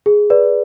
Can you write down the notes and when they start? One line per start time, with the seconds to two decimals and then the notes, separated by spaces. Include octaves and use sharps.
0.06 G#4
0.30 B4 D5